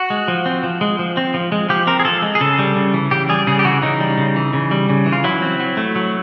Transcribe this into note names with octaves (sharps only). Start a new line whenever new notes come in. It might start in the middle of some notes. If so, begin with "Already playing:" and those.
Already playing: F#4
G#3
F3
C4
F3
G#3
F3
C4
F3
G#3
F3 G4
C4 A#4
G#4
F3 A4
G#3
G#4
C#3 A4
G3
C#3
E3
C#3 G4
G3 G#4
C#3 G#4
G4
E3 F#4
C#3 D#4
G3
C#3
E3
C#3
G3
C#3
E3
F4
F#3 E4
C4
F#3
A3
F#3